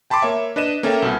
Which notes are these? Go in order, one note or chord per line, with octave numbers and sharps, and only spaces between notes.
G5 A5 B5 C6 D6
A#3 C#5 E5
D4 B4 D#5 D#7 E7
A#3 C#4 A4 A#4 E5 G5
C2 B2